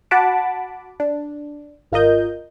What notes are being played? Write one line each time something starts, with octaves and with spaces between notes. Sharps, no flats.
F#4 F#5 A5 B5 D6
D4
G#1 F4 A#4 D#5 G6